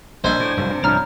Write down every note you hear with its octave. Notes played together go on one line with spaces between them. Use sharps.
A#1 D4 C5 D#5 G#5
A2
F1 G2 F#3
C3 D4
C2 G#2 F3 D4 C#5 A#5 F6